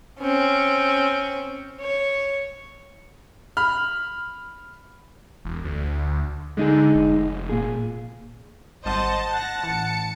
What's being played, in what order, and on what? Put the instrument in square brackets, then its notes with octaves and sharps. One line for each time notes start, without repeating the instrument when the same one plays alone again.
[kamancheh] C4 C#4
C#5
[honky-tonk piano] B5 F6
[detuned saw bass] E1
D2
[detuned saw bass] D3 [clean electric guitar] G#3 D#4 G#4
[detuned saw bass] F1
[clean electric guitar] A#2 G#4
[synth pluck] G#1 G3 [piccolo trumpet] C5 [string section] D#5 F#5 [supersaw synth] A5
[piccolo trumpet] F#5 [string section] F#6 A#6
[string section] A1 C#7 [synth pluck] E3